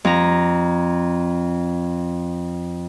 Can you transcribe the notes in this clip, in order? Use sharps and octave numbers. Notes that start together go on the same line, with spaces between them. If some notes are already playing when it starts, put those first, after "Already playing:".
F2 A#5